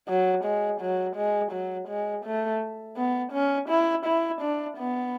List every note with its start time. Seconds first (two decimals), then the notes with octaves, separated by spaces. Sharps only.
0.08 F#3
0.44 G#3
0.81 F#3
1.16 G#3
1.52 F#3
1.88 G#3
2.25 A3
2.96 B3
3.33 C#4
3.69 E4
4.06 E4
4.41 D4
4.78 B3